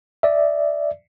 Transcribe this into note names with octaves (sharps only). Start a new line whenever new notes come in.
D5 E5